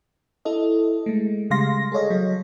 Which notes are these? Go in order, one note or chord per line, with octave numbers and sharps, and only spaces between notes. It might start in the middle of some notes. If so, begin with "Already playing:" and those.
E4 A4 D#5
G#3 A3
C#3 G3 G#3 F5 C6 A#6
G#4 A4 C#5 D#5
F#3